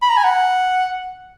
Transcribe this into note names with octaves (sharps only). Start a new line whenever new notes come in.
B5
A#5
G#5
F#5